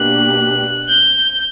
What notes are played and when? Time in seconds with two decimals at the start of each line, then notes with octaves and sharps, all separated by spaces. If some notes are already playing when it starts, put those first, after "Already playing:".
Already playing: B2 A#3 D4 G4 F#6
0.88 G6